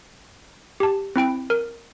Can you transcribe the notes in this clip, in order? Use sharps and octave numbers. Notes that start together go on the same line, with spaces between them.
G4 A5
C4 E4 G5 D7
A#4